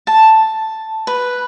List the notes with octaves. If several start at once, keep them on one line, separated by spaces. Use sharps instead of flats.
A5
B4